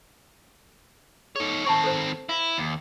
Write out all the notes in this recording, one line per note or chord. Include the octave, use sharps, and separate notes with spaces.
D#4 G#4 A4 C#5
D#3 C4 A5 B5 C#6
A4 C5
E4 F5
D#2